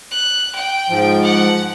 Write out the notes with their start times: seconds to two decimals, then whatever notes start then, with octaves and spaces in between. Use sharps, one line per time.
0.11 F#6
0.55 G5
0.90 G#2 F3
1.22 F#5